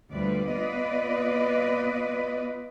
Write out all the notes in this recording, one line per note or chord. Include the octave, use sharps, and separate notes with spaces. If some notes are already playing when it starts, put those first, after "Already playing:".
D2 F3 G3 B4 D5
B3 F4 B4 D5 D#5